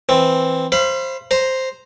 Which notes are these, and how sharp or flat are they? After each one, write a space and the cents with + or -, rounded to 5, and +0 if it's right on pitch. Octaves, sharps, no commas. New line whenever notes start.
E3 +0 C4 +0
C5 +15 F5 -35 B5 +10
C5 +0 A#5 +0